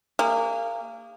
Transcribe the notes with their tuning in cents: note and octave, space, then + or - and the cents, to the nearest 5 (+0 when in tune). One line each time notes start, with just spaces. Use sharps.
A#3 -25 G#4 -40